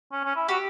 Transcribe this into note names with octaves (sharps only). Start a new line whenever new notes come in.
C#4
C#4
E4
F#4 G4